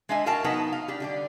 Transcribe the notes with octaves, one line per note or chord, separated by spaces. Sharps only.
G#3 D4 D#5 E5 G#5
F#4 A#4 F5 G5 A5 A#5
F#3 B3 D#4 B4 A5
F5
D4 G4
D3 G3 D5